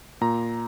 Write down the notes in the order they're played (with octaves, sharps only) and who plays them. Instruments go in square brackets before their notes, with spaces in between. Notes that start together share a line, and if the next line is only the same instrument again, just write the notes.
[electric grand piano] A#2 A#5